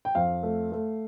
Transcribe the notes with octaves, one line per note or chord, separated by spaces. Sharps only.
G5
F2 F5
A3
A3